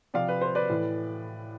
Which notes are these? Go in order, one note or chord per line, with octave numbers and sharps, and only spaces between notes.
C3 F3 D5 F5
B4
C5
B4 D5
A2 E3